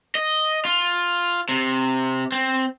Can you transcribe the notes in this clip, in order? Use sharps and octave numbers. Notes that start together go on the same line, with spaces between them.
D#5
F4
C3
C4